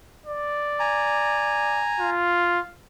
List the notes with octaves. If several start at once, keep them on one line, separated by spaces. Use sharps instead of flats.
D5
G#5 A#5
F4